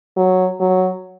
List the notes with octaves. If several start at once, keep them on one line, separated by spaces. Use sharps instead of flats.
F#3
F#3